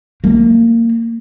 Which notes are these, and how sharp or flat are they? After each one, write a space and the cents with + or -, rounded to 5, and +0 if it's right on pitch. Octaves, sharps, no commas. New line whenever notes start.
A#3 -20